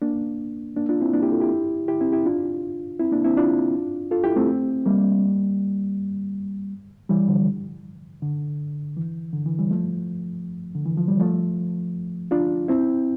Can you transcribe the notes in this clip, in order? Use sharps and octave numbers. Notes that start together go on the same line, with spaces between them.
A#3 D4
A#3 D4
D4 F4
C4 E4
A#3 D4
E4 G4
F4 A4
E4 G4
E4 G4
C4 E4
E4 G4
D4 F4
C4 E4
A#3 D4
C4 E4
D4 F4
F4 A4
E4 G4
A3 C4
G3 A#3
E3 G3
D3 F3
D3
E3
D3
E3
E3 G3
F3 A3
D3
E3
F3
G3
F3 A3
D4 F4
C4 E4